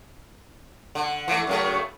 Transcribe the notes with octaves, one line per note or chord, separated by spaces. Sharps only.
D3
E3 A3
F#2 C#3 A3